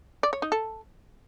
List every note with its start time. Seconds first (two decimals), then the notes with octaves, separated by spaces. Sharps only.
0.23 D5
0.33 C#5
0.42 D#4
0.52 A4